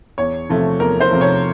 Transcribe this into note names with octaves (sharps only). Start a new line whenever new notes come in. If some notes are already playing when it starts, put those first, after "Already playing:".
E2 C#5
C3 F3 A3
E2 A#4
C5
C3 F3 A3
C#5